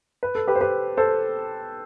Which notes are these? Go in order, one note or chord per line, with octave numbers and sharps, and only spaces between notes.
B4
A4
G4 B4
C5
G4 B4
A4 C5